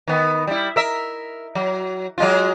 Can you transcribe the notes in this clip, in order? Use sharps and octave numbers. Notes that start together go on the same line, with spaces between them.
D#3 B3
G3 E4
A#4 E5
F#3
F#3 G#3 F4